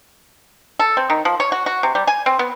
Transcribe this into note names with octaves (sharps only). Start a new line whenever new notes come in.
A4
C4
D#3
F3
C#5
F#4
F#4
C3
G3
G#5
C4
B3